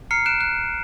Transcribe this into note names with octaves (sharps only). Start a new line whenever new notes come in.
A#5 F6 C7 C#7
F#6 D7 E7
F#6